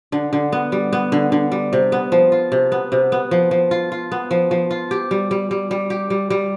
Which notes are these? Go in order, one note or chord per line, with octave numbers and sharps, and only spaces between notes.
D3
D3
B3
G3
B3
D3
D3
G3
C3
B3
F3
F4
C3
B3
C3
B3
F3
F3
F4
F4
B3
F3
F3
F4
G4
G3
G3
G3
G3
G4
G3
G3